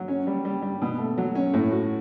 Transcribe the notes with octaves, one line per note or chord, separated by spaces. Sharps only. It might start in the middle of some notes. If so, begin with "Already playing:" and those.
Already playing: F#3
C#4
G3
G3
G3
B2
A3
F#3
C#4
A2
F#4